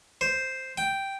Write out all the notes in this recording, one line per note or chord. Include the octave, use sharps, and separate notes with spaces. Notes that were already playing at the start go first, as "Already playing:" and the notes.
C5
G5